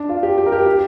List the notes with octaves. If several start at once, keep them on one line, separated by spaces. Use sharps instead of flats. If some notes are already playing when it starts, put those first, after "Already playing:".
Already playing: D4
F4
G4
G4
A#4
G4
G4